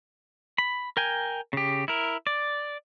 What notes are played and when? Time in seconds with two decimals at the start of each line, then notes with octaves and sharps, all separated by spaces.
0.58 B5
0.97 A#4 G5 G#5
1.53 C#3 G4
1.88 E4 A#4
2.27 D5